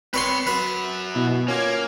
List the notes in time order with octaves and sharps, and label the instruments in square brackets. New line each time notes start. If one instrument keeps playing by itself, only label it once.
[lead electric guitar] C4 B5 [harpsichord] B4 C#5 C6
[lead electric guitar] F#2 F#4 [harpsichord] B4
[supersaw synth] B2 [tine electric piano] E4
[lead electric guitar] A#3 [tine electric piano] C#4 F4 [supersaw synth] D6 G#6